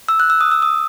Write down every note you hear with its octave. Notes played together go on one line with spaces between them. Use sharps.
E6
F#6
E6
D#6
E6
D#6